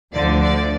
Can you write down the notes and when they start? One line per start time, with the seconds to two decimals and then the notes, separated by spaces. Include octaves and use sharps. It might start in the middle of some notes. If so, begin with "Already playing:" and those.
0.13 D2 D3 F3 D5
0.41 D5